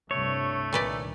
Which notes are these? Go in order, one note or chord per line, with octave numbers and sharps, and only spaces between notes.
C2 G2 C3 A3 C#5
C2 G2 A#2 D#3 B4 D5